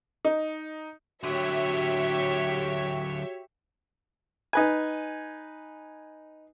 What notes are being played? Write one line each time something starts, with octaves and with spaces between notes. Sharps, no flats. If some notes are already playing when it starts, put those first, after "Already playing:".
D#4
D3 F#3 F#4 G4 C#5 E5
D#4 B4 G#5